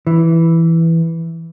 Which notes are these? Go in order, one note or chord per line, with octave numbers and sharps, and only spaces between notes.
E3